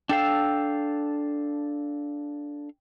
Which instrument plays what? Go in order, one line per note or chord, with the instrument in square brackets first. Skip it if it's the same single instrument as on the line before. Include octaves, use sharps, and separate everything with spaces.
[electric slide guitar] D4 A4 F5 [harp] G5 E6